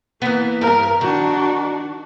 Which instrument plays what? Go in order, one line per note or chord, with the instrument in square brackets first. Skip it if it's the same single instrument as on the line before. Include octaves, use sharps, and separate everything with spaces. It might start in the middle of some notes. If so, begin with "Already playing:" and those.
[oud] E3 B3 [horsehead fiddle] A#3
[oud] G2 [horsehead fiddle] A#4
[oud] D#3 [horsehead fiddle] D4 F#4